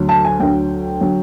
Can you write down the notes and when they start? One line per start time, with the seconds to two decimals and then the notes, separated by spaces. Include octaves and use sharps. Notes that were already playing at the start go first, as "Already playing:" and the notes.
Already playing: D2 D3 F#3
0.09 A5
0.25 G#5
0.40 D2 D3 F#3 G5
1.01 D3 F#3